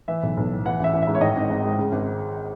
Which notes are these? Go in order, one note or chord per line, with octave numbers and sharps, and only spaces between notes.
E3 E5
B1
B1
A2
E3 F#5
A1
E5
A1
E5
G#2
C#5
D#3 D#5
G#1
G#1
G#2
C#3
G#1